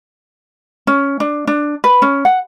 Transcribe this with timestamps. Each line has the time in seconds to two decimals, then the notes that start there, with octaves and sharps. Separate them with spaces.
0.87 C#4
1.20 D4
1.47 D4
1.84 B4
2.02 C#4
2.25 F#5